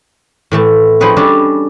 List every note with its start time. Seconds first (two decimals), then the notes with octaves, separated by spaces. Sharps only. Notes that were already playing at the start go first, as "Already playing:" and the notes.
0.51 A2 E3 A3 A5
1.00 F3 C4 D#4 G#4 B4 C#5
1.17 G3 C#4 D4 A4